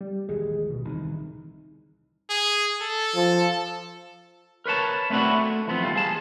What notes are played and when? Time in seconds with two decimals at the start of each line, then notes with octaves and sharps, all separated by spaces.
0.01 G3
0.29 A1 D#2 G#3
0.70 B2
0.85 C2 D#3 E3
2.30 G#4
2.81 A4
3.15 F3
4.66 A#4 B4 C#5 A5
5.10 A3 B3 C4 D4 E4 F#4
5.34 A3
5.67 E3 F3 B3 C4
5.82 D#2 C#3 G3 F4
5.96 G#4 A5